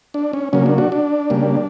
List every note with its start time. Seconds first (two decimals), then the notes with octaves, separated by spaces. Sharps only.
0.14 D4
0.33 C#4
0.53 C#3 F#3 A#3 C#4
0.66 D4
0.78 D4 F#4
0.92 D4
1.30 C#3 G3 A#3